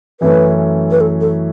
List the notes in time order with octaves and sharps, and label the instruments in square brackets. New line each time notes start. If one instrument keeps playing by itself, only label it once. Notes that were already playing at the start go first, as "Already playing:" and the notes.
[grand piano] F#2 E3 A3 C#4 [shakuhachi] B4
[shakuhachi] B4
A4
A4